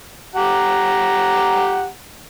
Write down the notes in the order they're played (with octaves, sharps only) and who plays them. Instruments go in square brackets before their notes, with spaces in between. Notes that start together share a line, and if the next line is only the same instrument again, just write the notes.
[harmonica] G4 F#5 A#5